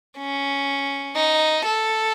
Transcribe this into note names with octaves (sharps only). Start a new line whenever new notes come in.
C#4
D#4
A4